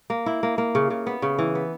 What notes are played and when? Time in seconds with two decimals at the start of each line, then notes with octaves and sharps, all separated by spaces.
0.10 A#3
0.26 E4
0.43 A#3
0.58 A#3
0.75 C#3
0.90 C#3
1.07 B3
1.22 C#3
1.39 E3
1.55 B3